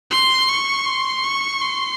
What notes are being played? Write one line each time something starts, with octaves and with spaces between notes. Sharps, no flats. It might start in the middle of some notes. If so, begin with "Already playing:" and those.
C6
C#6
C6
C#6
C6